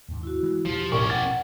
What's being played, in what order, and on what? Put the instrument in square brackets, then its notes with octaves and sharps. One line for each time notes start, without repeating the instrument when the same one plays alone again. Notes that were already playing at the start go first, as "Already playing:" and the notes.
[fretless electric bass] D#2 G#2
[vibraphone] E4 F#4
[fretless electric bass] E3 G#3
[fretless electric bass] E1 A#1 [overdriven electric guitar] F3 [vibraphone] G4
[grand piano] A1 A#4 C#6 [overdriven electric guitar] C#4 D5
[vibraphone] F#5 G5 [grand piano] A6